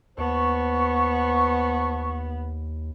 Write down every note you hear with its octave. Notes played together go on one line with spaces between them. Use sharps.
D#2 B3 C5 A5 C#6